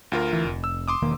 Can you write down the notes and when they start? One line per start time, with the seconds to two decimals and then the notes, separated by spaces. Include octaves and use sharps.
0.12 D2 F4 A#4
0.33 E3
0.45 F1
0.64 E6
0.88 C6 D6 D#6
1.02 E1 D#3 A#3